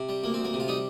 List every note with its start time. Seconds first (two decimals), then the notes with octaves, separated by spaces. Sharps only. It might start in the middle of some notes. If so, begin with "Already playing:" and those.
Already playing: C3
0.09 G3
0.23 D2 A#3
0.34 D2 C4
0.44 A#3
0.53 C3
0.60 F4
0.68 G3 D#4